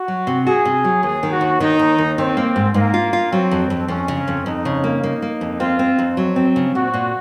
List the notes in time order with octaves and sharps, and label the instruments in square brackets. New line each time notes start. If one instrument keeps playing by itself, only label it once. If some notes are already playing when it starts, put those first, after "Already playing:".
Already playing: [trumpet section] F#4
[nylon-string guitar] F#3
C3
[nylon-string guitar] F#4 [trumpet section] G#4
[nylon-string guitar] C3
F#3
[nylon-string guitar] D#2 [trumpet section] G#4
[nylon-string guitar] D#3
[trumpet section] F#4
[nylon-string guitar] D#2
[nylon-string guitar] D#3 [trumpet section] D#4
[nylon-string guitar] D#2
D#2
[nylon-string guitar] D#3 [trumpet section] C4
[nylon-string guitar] A#3
G#2
[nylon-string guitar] G#2 [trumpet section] A#3
[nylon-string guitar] F4
F4
[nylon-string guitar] F#3 [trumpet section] C4
[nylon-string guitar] F2
F2
[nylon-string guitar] F2 [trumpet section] C#4
[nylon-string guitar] C#3
F2
[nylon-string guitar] F2 [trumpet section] D#4
[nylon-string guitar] C#3
A#3
[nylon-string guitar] A#3 [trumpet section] D#4
[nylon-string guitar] A#3
F2
[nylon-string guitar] C4 [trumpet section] F4
[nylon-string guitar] C4
F2
F#3
C4
C#3
[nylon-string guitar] A#2 [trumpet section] F#4
[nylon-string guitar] A#2